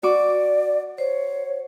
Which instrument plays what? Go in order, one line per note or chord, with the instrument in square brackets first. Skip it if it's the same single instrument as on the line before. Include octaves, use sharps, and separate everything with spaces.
[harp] F#4 D6 [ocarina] D5
[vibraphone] C5 [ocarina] C#5